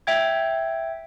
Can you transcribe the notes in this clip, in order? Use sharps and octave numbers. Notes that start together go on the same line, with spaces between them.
E5 G5 G#6